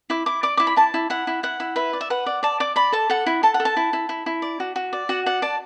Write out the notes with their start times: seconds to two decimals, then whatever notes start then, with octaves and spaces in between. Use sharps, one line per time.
0.10 E4 D6
0.26 E4 D6
0.43 D5 D6
0.57 E4 D6
0.67 B5
0.76 E4 A5
0.94 E4
1.10 E4 F#5
1.27 E4
1.43 E4 F#5
1.60 E4
1.76 B4 E5
1.93 D5
2.01 E5
2.10 B4 F#5
2.26 D5
2.43 D5 A5
2.60 D5 D6
2.76 D5 B5
2.92 A4 A5
3.10 A4 F#5
3.26 E4
3.43 A4 A5
3.54 F#5
3.60 A4
3.65 A5
3.76 E4
3.93 E4
4.09 E4
4.26 E4
4.42 D5
4.60 F#4
4.76 F#4
4.93 D5
5.09 F#4 F#5
5.26 D5 F#5
5.42 D5 A5